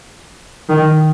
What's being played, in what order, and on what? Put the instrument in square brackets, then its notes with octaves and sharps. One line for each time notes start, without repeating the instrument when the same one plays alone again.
[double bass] D#3